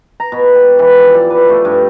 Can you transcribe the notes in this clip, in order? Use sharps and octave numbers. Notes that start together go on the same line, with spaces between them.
A#5
B2
G4
E3
F3
D5
B4
A3
G2